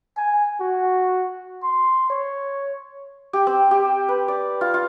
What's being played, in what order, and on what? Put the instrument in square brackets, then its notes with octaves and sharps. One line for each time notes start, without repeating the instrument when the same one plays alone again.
[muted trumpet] G#5
F#4
C6
C#5
[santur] G4
C4
G4
B4
D5
F4
F4